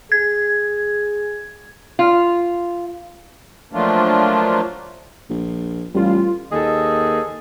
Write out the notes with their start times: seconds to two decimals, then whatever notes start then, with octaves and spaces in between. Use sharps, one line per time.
0.12 G#4 G#6
1.99 F4
3.73 F3 F#3 A3 A#3 D4 F4
5.30 A#1
5.94 A1 G3 F4
6.52 D#2 G#4 A4 D#5